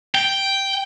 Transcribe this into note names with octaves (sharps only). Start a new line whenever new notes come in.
G5